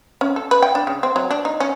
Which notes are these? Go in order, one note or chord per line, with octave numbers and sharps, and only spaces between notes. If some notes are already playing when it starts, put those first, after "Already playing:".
C#4
A4
B4
G5
D4
C#3
C4
F#3
D4
D#4
C#4